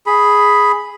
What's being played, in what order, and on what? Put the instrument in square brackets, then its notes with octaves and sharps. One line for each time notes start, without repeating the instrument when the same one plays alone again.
[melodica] G#4 B5